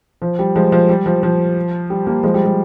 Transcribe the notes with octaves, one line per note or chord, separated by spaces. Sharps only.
F3
G3
F3 G#3
F3
G3
F3
F3
G3
G3 A#3
F3 G#3
G3
G3